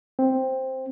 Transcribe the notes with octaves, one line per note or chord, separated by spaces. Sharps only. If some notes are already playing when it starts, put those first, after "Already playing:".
C4